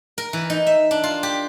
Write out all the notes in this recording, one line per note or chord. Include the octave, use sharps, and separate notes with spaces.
A#4
E3
D#4
E5
D4
F4
G4